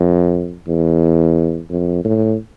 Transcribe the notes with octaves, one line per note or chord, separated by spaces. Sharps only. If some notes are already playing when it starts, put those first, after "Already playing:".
Already playing: F2
E2
F2
A2